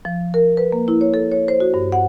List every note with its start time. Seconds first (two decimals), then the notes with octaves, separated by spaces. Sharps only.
0.05 F3
0.34 A#4
0.57 B4
0.72 A#3
0.88 E4
1.01 C#5
1.14 A4
1.32 C#5
1.48 C5
1.60 F#4
1.74 G2
1.92 F#5